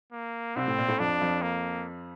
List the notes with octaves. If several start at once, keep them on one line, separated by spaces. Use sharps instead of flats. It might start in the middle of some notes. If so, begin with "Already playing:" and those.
A#3
C2 C3 C4
A2
A#2
A2 A3
F2 F3 D4
F2 F3
A#3